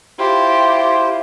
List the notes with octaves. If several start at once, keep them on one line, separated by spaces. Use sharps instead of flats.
E4 F4 G4 C5